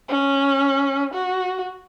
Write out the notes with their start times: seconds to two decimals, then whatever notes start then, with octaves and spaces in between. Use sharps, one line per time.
0.09 C#4
1.14 F#4